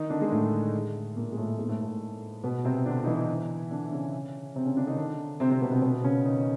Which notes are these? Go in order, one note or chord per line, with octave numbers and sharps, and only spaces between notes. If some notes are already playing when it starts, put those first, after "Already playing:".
Already playing: D#3 D#4
D3 D4
G#3
A2 A3
A#2 A#3
G#3
A2 A3
A3
G#2 G#3
A#3
A2 A3
A2 A3
B2 B3
C3 C4
D3 D4
D#4
E3 E4
D3 D4
C#3 C#4
C3 C4
C#3 C#4
D3 D4
D#3 D#4
D3 D4
C3 C4
C3 C4
B2 B3
C3 C4
B2 B3
C#3 C#4
D#3 D#4